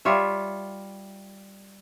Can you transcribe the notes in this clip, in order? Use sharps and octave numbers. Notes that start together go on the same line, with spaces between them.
G3 F4 C#5 E5